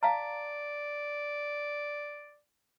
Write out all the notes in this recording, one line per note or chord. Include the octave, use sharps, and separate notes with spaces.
D5 F5 A5 A#5